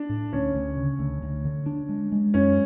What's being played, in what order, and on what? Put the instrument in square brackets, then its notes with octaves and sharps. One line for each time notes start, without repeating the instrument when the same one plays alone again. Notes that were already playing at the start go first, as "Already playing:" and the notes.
Already playing: [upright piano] D4
[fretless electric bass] A2
[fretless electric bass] D2 [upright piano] C#4
[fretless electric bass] D2
C#3
D2
D2
D3
D4
G#3
G#3
[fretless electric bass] F#2 [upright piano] C#4